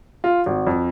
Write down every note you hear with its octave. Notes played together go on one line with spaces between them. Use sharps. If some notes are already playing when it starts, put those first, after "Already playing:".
F4
G#1
F2